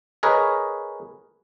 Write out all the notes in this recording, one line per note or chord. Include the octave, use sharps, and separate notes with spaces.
G#4 A#4 B4 C#5 D#5